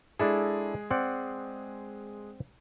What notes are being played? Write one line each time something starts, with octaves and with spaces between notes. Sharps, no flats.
G#3 D4 E4 G#4 A4
C4 D5 F#5